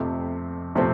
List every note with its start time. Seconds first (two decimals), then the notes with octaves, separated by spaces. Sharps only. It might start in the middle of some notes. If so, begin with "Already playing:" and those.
Already playing: F2 C3 F3 A3 C4
0.75 C3 F3 A3 C4